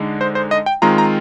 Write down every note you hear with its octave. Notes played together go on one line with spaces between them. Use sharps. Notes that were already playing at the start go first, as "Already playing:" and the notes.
Already playing: D3 G#3 D#4
C5
C5
D#5
G5
D#3 G#3 C4 F4 A#5
A#5